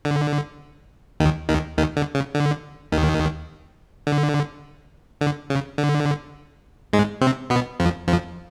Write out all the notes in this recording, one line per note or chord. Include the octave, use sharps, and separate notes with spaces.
D3
D#2 D#3
D#2 D#3
D#2 D#3
D3
C#3
D3
D#2 D#3
D3
D3
C#3
D3
G#2 G#3
C3 C4
B2 B3
F2 F3
F2 F3